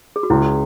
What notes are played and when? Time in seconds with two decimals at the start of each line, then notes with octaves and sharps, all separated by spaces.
0.16 G#4
0.23 F#4
0.30 C#2 E4